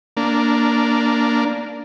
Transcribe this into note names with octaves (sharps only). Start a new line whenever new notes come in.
A#3 D4